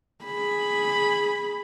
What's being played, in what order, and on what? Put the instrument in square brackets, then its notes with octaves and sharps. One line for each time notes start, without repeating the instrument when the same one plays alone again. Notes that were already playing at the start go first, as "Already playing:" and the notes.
[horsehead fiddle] G#4 B5